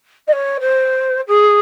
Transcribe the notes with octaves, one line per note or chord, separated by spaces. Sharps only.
D#5
C#5
C5
G#4